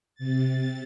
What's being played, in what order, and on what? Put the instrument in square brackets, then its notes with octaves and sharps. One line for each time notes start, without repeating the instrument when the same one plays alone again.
[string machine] C3 A6